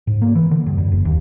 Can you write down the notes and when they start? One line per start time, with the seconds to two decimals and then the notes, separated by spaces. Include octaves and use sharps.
0.07 G#2
0.22 A#3
0.35 E3
0.51 D3
0.66 G2
0.78 F#2
0.92 F#1
1.05 D#2